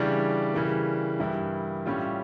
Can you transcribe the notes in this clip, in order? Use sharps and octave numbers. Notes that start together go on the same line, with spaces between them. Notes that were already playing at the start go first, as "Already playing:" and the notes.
Already playing: C#3 E3 G3 D4
C#3 E3 G3 A#3
G2 E3 A#3 E4 G4
A2 G3 C#4 F4